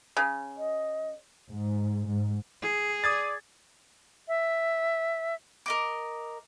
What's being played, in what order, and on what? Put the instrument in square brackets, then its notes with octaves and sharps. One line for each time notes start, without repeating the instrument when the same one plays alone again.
[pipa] C#3
[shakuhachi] D#5
[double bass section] G#2
G#2
[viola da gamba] G#4
[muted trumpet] D5 [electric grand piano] D#6 G#6 A6
[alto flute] E5
[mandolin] A#4 D#5 D6